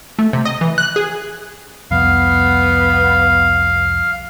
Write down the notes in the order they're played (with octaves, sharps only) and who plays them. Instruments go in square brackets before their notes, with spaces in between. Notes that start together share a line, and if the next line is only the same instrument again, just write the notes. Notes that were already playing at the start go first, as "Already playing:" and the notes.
[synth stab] A3
C3
D#5
E3
F#6
G#4
[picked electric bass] C2 F2 [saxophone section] B3 [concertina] F5